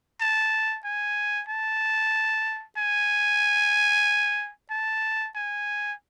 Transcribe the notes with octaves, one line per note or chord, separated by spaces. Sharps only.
A5
G#5
A5
G#5
A5
G#5